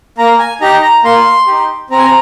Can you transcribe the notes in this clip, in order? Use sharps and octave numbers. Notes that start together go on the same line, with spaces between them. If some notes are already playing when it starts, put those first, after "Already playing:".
A#3 A#5
G#5
D#4 G4 A#5
A#5
A#3 C6
D#4 G4
C4 A#5
G#5
A#5